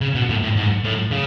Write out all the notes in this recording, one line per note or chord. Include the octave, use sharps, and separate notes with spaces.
C#3
B2
A2
A2
G#2
A2
C#3